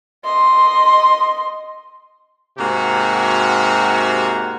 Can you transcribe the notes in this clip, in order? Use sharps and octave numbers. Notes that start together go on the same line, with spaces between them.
D#5 C6
G#2 C3 A#3 F#4